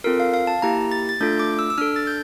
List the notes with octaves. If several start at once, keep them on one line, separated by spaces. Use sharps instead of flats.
C4 F4 A4 A#4
F5
F5
A5
A#3 E4 G4 A#5
A6
A6
A3 D4 F4 A4 G6
D6
E6
E6
D4 A4 F6
A6
G6